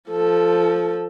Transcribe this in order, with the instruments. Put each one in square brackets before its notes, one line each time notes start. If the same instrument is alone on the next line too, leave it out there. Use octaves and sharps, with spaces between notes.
[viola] F3 A4